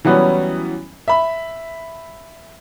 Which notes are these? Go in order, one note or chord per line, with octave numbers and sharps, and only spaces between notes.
E3 F#3 G3 B3 C#4
E5 B5